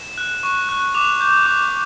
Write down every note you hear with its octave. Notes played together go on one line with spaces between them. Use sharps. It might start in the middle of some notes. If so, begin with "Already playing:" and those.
Already playing: E7
F#6
C#6
F#6
D6 F7
G6
D6